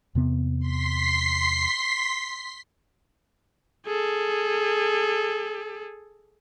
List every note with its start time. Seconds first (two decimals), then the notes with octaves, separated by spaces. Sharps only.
0.15 E2 C3 B3
0.59 C6 B6 C7
3.86 G#4 A4